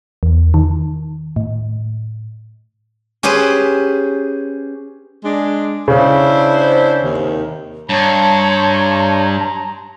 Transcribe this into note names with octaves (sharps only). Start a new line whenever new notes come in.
E2
D#3
A2
C#4 G4 G#4 B4 C5
G#3 D4
C#3 D4 E4 C5
D#2 C3 D#3
G2 C#5 A5 A#5 C6